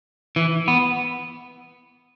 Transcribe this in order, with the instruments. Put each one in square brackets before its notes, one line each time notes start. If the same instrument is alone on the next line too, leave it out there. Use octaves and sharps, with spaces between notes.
[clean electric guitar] E3
B3